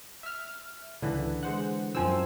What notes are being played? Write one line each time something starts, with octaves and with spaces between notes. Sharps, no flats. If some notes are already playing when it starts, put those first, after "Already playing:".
E5 F6
C#2 D3 E3
G#3 C5 F#5
F#2 F3 C4 G#5 E6